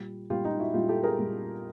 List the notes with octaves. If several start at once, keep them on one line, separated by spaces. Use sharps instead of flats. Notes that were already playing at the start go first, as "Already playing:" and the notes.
Already playing: A#2 G3
A#2 G3 F4 G4
D#4 F4
E4 F#4
A#2 G3 F4 G4
G4 A4
G#4 A#4
A#2 G3